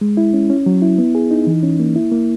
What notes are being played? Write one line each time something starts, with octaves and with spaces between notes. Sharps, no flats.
G#3
E4
C#4
C#4
F#3
E4
B3
G#4
D#4
E3
C#4
A#3
E4
A#3